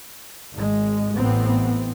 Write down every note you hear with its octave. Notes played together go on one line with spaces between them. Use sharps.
G#1 G#3
A1 A2 E3 B3 C4